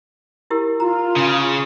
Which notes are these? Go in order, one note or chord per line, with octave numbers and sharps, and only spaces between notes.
E4 G4 A#4
F4 A#5
C#3